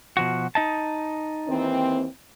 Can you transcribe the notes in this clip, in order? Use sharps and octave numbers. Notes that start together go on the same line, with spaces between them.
B2 F3 F#4
D#4 D#5 A5
D#2 E3 C4